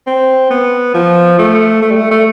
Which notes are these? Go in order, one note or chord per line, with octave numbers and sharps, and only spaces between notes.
C4
B3
F3
A3
A3
G3
A3
A3